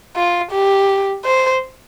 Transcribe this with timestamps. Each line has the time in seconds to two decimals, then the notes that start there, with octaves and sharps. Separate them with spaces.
0.16 F4
0.51 G4
1.25 C5